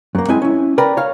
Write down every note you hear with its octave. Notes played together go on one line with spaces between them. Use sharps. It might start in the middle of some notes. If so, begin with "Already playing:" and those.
F#2 A#3
G#3 C4 E4 G#5
C#4 E4
A#4 B4 D5 G5 A#5 B5
C#5 F5